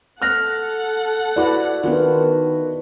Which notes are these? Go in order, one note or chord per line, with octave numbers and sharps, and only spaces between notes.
A4 F#5 F6 F#6 A#6
E4 F#4 B4 D5
D#3 B3 D4 F4